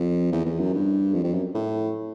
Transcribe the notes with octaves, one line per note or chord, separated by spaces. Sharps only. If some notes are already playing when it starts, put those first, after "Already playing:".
Already playing: F2
E2
E2
F#2
G2
F2
F2
F#2
A2